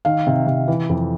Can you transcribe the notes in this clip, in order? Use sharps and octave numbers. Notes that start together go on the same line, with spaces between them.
D#3 F5
C3
C3
E3
F2